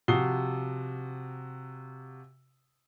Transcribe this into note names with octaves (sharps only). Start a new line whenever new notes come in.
C3 F3 F#4 D#6 C7 G7